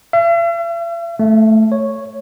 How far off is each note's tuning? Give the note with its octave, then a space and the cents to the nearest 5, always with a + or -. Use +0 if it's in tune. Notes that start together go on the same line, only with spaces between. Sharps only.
E5 +45
A3 -5
C#5 -5